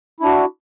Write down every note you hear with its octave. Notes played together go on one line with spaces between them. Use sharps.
D4 E4 F#4